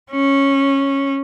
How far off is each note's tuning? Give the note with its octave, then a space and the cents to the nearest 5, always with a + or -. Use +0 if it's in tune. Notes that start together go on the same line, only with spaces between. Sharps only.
C#4 -10